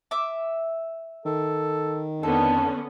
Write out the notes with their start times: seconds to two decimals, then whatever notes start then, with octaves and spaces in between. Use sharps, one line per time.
0.11 E5 D6
1.26 D#3 A4
2.23 F2 D3 B3 C#4 A4